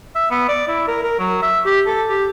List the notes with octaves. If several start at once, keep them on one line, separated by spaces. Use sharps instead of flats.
E5
B3
D5
E4
A#4
A#4
F#3
E5
G4
A4
G4